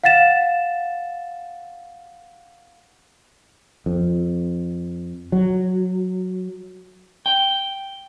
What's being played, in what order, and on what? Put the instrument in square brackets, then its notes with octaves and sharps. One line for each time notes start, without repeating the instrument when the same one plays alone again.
[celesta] F5 F#5 A6 E7
[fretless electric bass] F2
F#3
[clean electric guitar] G5